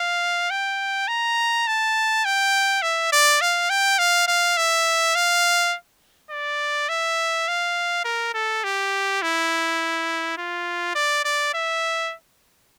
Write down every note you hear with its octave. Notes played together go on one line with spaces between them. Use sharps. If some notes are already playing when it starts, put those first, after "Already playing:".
Already playing: F5
G5
A#5
A5
G5
E5
D5
F5
G5
F5
F5
E5
F5
D5
E5
F5
A#4
A4
G4
E4
F4
D5
D5
E5